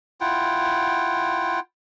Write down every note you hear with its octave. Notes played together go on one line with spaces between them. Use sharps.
E4 F4 F#5 G5